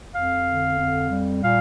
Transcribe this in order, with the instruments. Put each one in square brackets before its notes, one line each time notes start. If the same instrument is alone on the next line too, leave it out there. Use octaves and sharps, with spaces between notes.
[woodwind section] F2 F5
D3
F2
G3
A#2 F5